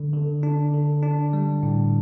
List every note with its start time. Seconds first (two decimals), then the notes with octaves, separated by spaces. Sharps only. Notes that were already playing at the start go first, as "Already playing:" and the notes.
Already playing: D3
0.13 D3
0.43 D4
0.74 D3
1.03 D4
1.33 G3
1.63 A2